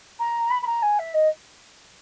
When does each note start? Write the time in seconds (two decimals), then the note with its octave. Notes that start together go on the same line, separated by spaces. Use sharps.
0.19 A#5
0.50 B5
0.62 B5
0.67 A#5
0.82 G#5
0.99 E5
1.14 D#5